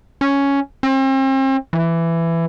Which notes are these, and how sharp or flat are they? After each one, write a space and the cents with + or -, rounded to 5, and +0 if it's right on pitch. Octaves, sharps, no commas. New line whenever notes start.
C#4 +5
C4 +40
E3 +15